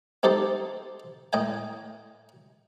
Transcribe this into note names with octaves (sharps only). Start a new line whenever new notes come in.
C4 D#4 G4 A4 C5
A2 D#5 G5 G#5